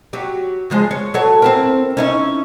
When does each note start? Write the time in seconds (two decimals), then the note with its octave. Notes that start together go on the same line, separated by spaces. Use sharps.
0.13 F#3 G4
0.70 C#3 F3 G#3
0.91 C#5
1.14 F#3 A4 C#5
1.42 C4 E4 A#4
1.97 C#4 D#4 E4